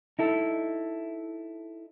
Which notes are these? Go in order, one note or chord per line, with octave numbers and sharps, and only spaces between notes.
D#4 E4 A4